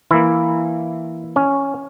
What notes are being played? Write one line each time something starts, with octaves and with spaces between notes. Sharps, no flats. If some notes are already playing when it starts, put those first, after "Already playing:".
E3 A#3 E4
C#4